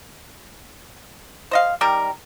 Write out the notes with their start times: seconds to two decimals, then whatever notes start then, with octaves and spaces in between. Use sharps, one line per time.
1.51 C5 D#5 F5
1.81 D#3 G3 G4 A#4